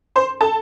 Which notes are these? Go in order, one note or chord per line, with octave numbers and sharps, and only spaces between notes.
C5 C6
A4 A5